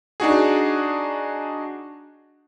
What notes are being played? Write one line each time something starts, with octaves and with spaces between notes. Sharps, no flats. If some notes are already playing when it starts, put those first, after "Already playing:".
D4 D#4 F#4 G#4